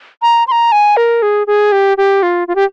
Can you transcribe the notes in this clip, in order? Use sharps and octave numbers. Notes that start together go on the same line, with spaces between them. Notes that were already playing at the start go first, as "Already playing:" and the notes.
A#5
C6
A#5
G#5
A#4
G#4
G#4
G4
G4
F4
F4
G4